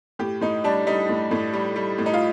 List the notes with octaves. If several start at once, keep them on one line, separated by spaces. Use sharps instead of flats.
A2 G4
A2 D#4
G3 D4
G3 D#4
A2
A2
G3
G3
A2
D#4
F4